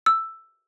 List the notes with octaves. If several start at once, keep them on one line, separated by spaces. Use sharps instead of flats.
E6